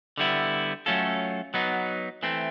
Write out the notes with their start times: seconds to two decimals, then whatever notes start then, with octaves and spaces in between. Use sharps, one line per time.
0.18 D3 G3 B3 E4
0.86 F#3 A3 C#4 F4 A4
1.54 F#3 B3 D#4
2.23 E3 A3 C4